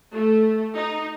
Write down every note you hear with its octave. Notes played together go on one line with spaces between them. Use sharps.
A3
D#4